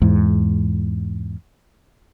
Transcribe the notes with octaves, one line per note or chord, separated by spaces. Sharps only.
E2 G#2